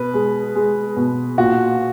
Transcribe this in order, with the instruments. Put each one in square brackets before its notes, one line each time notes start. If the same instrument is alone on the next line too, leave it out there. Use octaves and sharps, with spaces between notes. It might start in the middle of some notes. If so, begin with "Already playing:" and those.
Already playing: [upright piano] B2 [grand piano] B4
[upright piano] G#3
G#3
B2
[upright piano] A#2 [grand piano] F#4